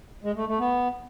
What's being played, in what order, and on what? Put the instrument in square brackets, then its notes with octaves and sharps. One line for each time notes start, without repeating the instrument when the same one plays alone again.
[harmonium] G#3
A3
A3
B3